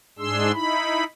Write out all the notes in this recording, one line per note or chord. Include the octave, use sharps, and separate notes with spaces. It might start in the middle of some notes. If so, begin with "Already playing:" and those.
G#2 G#3 D4 G#4 C6 E6
D#4 E4 B5